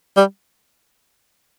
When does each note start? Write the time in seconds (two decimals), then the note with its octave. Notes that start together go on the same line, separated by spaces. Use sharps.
0.16 G3